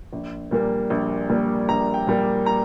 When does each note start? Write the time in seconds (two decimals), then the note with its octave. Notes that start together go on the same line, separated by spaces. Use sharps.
0.13 A#1
0.51 A#2 G3 A#3
0.90 A#1
1.29 A#2 G3 A#3
1.69 A#1 A#5
1.94 G5
2.07 A#2 G3 A#3
2.46 A#5